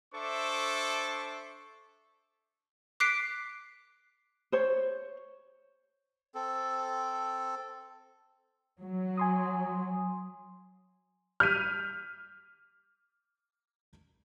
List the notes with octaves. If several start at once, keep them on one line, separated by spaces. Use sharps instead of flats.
D4 A4 C5 E5 C#6 D6
D6 F#6 B6 C7 D7
C5 C#5
C4 A4
F#3
G#5 C6 D#6
F6 G6 B6 D#7